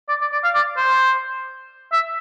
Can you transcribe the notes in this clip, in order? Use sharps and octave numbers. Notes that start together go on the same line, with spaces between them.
D5
D5
D5
F5
D5
C5
E5